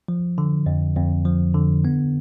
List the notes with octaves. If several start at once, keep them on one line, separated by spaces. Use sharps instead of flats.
F3
D3
F2
F2
F3
D3
B3